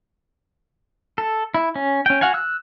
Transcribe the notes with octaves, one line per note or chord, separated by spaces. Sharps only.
A4
E4
C#4
C#4 G5
F#4 F5 F#5 G#5
E6 F#6